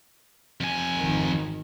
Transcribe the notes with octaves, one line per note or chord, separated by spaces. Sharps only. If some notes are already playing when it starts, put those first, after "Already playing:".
F2 G#5
G#1 D#3